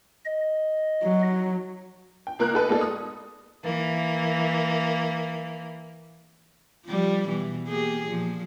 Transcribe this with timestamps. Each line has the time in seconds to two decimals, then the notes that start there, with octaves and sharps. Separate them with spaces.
0.25 D#5
1.04 F#3
2.27 G5
2.39 C#2 A#3 A#4 F#6
2.54 D#4 A4 B4
2.68 G#3 A#3 B3 D#4 A4 D5
2.81 D#6
3.64 E3 A#3
6.86 F3 G3
7.27 B2 E3
7.68 A#3 G4 G#4
8.07 A#2 F3